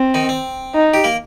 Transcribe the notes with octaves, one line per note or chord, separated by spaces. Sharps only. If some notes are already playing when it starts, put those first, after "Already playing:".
Already playing: C4
D#3 D#4
C4
D#4
G4
A#3 A#4